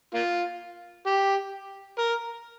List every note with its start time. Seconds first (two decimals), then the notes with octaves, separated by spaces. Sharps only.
0.14 A#3 F4
1.06 G4
1.99 A#4